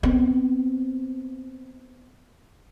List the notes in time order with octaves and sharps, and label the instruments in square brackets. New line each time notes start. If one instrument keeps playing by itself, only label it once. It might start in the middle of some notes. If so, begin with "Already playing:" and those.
[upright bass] B3 C4